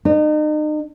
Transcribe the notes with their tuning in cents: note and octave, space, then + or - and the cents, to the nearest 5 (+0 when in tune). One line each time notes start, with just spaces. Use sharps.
D#4 -35